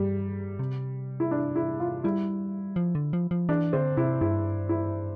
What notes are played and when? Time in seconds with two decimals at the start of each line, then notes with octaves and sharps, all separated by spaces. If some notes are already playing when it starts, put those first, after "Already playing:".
Already playing: G2 G3
0.59 C3
1.20 E4
1.31 D4
1.56 E4
1.80 F4
2.04 G3 E4
2.76 F3
2.95 D3
3.13 F3
3.31 F3
3.49 E3 D4
3.73 D3 C4
3.97 C3 E4
4.21 G2 E4
4.69 E4